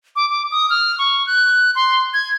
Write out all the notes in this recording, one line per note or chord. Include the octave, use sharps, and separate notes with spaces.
D6
D6
D#6
F6
C#6
F#6
C6
G#6